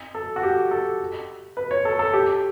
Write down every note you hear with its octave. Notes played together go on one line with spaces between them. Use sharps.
A4
F#4
G4
A4
B4
C#5
A4
A4
G4